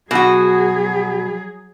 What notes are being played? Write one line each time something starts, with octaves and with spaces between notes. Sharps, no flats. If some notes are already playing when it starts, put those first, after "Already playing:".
B2 F#3 F#4 G#4